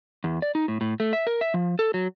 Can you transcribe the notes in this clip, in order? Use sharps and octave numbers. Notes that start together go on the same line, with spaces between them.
E2
D5
D#4
A2
A2
A3
E5
A#4
E5
F3
A4
F#3